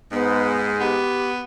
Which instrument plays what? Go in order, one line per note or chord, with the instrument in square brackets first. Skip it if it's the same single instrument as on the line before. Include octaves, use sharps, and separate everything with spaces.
[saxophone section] G#2 G#3 [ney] B3
[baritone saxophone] B3 [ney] G4